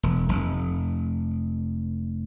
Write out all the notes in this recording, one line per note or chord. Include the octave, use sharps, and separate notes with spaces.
E1
F1